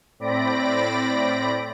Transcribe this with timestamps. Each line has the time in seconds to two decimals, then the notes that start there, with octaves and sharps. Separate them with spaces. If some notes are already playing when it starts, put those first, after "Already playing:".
0.19 A2 C4 D5 B5 A#6 D7